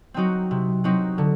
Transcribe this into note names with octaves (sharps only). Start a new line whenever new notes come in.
F#3 C4 D#4 F#4
C3
F#3 C4 D#4 F#4
D3